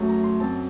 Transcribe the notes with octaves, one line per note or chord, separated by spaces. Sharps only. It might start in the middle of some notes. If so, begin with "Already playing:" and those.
Already playing: F#2 F#3 A3
A#5
C6
F#2 F#3 C4 A5